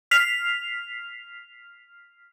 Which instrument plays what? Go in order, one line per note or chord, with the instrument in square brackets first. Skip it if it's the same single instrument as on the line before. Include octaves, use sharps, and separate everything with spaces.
[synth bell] F6 B6 C7 F7